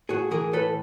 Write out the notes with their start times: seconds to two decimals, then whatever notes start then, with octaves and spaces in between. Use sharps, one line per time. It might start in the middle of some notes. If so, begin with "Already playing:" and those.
0.09 A2 F#4 G#4
0.31 E3 G#4 A#4
0.53 A2 A4 B4